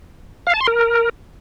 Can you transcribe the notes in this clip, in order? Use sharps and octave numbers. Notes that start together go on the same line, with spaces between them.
F5
A5
C6
A#4